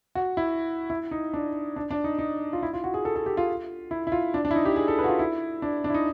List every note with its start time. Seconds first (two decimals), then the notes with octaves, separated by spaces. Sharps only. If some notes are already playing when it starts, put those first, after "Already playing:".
0.15 F#4
0.37 E4
0.90 E4
1.11 D#4
1.34 D4
1.76 D4
1.91 D4
2.04 D#4
2.19 D#4
2.53 F4
2.63 E4
2.73 F4
2.84 F#4
2.94 G#4
3.05 A4
3.16 A4
3.26 G4
3.37 F4
3.91 E4
4.07 E4
4.12 F4
4.34 D4
4.45 D4
4.51 E4
4.56 D#4
4.65 G4
4.76 G#4
4.88 A4
4.99 B4
5.04 F#4
5.08 F4
5.19 E4
5.62 D4
5.84 D4
5.90 E4
5.94 D#4